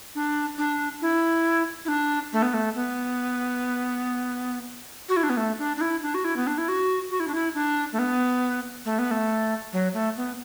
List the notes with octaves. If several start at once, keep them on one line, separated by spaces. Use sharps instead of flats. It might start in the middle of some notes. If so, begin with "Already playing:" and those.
D4
D4
E4
E4
D4
A3
B3
A3
B3
F#4
E4
D4
B3
A3
D4
D4
E4
D4
F#4
E4
B3
D4
E4
F#4
F#4
E4
D4
E4
D4
A3
B3
A3
B3
A3
F#3
A3
B3